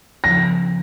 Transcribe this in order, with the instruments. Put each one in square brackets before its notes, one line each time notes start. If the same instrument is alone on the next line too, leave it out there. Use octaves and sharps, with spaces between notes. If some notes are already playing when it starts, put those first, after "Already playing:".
[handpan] C#3 F3 B3 D#4 [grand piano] A#6